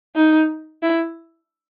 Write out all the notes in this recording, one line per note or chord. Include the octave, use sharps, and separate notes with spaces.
D#4
E4